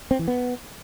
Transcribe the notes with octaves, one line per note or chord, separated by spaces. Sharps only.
C4
E3
B3